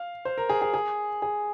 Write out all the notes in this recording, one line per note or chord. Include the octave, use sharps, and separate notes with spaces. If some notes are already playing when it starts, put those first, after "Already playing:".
Already playing: F5
C5
A#4
G#4
G#4
G#4
G#4